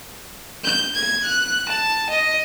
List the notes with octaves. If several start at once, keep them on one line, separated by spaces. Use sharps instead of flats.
G6
G#6
F#6
A5
D#5